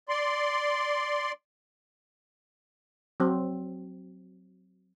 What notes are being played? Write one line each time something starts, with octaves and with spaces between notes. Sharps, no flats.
D5 C6
F#3 C4